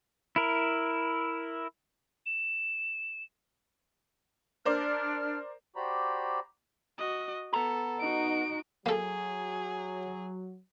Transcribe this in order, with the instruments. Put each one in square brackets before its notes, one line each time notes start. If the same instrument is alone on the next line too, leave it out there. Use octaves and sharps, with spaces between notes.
[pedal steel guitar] E4 A#4
[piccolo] E7
[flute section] D4 F6 [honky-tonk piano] A#4 C5 D5
[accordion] F#4 G4 C5 D5 A#5 B5
[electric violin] F#4 D#5
[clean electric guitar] B3 A#5 [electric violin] A4
[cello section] D#4 [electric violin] F#4 D7
[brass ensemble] F#3 [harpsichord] A#3 A4 [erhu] G#4